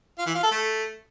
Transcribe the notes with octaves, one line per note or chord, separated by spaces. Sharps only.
F4
E3
F4
A4
A3